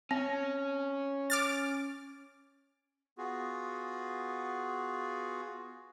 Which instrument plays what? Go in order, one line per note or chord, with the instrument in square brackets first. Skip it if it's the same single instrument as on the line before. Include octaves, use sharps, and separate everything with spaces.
[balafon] C4 [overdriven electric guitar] C#4
[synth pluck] D6 F6 A6
[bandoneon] B3 F4 F#4 G#4